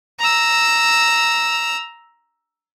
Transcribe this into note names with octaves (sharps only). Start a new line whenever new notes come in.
A#5 E6